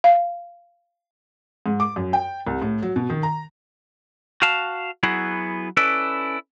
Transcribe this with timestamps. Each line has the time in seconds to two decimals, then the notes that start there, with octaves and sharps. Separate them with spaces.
0.04 F5
1.66 G#2
1.80 D6
1.96 F#2
2.13 G5
2.47 C2
2.62 A2
2.82 F#3
2.96 B2
3.10 D#3
3.23 A#5
4.42 F#4 F5 A5
5.03 F#3 B3 E4 F#4 G#4
5.77 C#4 E4 A4 B4 D5